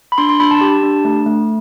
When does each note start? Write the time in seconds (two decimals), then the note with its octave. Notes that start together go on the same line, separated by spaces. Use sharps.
0.12 B5
0.18 D4 C6
0.29 C6
0.40 D4 B5
0.51 A5
0.61 G4
0.83 D4
1.05 A3
1.26 A3